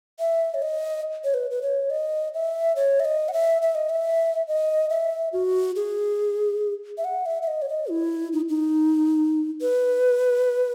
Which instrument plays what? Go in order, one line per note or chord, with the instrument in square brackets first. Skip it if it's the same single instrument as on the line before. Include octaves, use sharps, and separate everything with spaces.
[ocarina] E5
C#5
D#5
C#5
B4
B4
C#5
D#5
E5
C#5
E5
D#5
F#5
E5
E5
D#5
E5
D#5
E5
F#4
G#4
E5
F#5
E5
E5
D#5
C#5
D#5
E4
D#4
D#4
B4